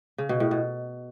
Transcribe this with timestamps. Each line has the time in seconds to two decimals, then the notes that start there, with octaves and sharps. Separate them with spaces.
0.18 C#3
0.29 B2
0.40 A2
0.51 B2